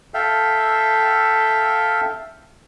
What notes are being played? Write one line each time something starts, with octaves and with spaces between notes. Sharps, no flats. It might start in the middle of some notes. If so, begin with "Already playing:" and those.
A4 E5 F5 G5